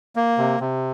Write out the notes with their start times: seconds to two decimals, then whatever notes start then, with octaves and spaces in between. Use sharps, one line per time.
0.16 A#3
0.38 C3
0.60 C3